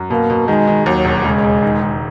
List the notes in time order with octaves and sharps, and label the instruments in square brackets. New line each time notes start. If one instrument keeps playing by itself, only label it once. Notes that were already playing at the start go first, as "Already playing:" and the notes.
Already playing: [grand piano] F#2
[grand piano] B2 [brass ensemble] A#3
[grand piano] B2
[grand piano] D#3 [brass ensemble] G#3
[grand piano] D#3
[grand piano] D#2 [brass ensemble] F#3
[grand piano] E1
[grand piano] C#3 [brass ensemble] G#3
[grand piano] E1
D#3
D#3